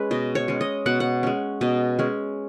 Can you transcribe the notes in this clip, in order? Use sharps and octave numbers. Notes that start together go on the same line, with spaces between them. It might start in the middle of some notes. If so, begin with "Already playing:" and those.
Already playing: G#3 C#4 G#4 B4
B2 D#5
C#5
G#3 C#4
D#5
B2 F#5
F#5
G#3 C#4
B2 D#5
G#3 C#4